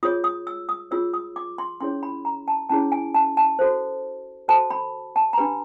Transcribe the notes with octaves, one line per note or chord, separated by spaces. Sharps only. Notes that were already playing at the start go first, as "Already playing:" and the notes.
F4 G#4 C#5 D#6
D#6
E6
D#6
F4 G#4 C#5 E6
D#6
D6
C6
C#4 E4 G#4 C#5 C6
B5
A#5
A5
C#4 E4 G#4 C#5 A5
G#5
A5
A5
F#4 A4 C5
F#4 A4 C5 A5
B5
A5
A#5
D4 G4 B4 B5